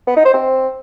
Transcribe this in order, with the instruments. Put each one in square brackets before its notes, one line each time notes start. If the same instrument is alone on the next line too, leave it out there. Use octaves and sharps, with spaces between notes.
[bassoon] B3
D#4
C5
C4